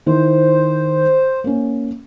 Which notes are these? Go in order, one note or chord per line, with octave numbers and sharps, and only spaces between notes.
D#3 D#4 E4 C5
A#3 C#4